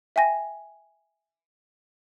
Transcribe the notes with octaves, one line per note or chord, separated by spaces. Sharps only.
E5 G5 G#5 A#6